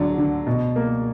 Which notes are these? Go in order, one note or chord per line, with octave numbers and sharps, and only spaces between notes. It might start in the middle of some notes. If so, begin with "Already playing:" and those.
Already playing: D3 F#3 D5
D3
B2
A#3